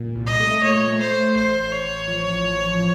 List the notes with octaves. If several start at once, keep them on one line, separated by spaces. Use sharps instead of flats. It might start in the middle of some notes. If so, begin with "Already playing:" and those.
Already playing: A#2
C2
D#5
A3
A#2 C#5
A3
C5
A3
A1 C5
A1
C#5
A1
F3
A1
F3